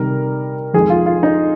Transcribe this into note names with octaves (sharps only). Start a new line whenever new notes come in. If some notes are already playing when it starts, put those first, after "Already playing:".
Already playing: C3 D#3 G3 A#4
F2 D#3 G#3 G#4
F4
F4
D#4